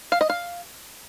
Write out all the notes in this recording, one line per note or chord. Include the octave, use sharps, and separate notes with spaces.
F5
D#5
F5